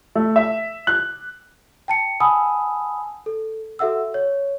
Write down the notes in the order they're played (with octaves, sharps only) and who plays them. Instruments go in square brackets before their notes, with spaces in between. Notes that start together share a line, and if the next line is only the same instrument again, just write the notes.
[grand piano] A3
E5
F#6
[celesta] G5 A5 C#7
F#5 G#5 A5 B5 D#6 E6
A4
F#4 A4 E5 F#5 E6
C#5